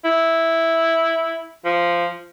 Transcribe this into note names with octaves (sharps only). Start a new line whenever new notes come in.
E4
F3